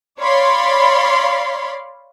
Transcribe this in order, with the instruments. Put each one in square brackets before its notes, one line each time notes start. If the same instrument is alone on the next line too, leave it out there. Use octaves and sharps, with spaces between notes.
[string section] C#5 D5 F5 B5 C6